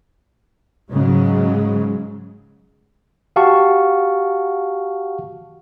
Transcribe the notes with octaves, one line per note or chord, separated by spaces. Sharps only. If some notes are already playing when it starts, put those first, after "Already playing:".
G#2 C#3 F#3 G#3
F#4 G4 F5 F#5 A5 C#6